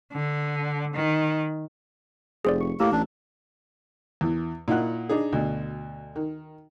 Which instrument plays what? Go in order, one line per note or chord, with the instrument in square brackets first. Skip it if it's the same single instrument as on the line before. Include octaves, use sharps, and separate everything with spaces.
[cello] D3
D#3
[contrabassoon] F1 [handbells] G#4 C5 D5
[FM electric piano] C#6
[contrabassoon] A2 [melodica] A#3 [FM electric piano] G4 A#5 E6
[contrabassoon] A1 [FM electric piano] A3 [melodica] D4
[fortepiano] E2 E3
A#2 D#4 E4 F#5 F#6
D4 D#4 G#4
D2 B2
D#3